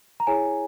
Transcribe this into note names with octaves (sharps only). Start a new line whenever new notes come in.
A#5
E4 G#4 C#5 G#5